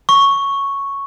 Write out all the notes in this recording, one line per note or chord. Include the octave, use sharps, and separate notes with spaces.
C#6